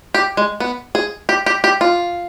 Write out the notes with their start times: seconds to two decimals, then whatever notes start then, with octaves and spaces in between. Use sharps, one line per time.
0.14 G4
0.37 G#3
0.60 B3
0.95 G#4
1.29 G4
1.46 G4
1.64 G4
1.81 F4